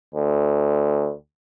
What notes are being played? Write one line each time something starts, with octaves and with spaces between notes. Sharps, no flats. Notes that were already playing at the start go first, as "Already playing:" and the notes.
D2